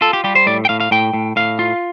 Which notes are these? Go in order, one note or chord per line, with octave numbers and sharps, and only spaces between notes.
F4 A4
G4
G3 G4
C5
A2 D5
G5
A2 F5
F5
A2 G5
A2
A2 F5
F4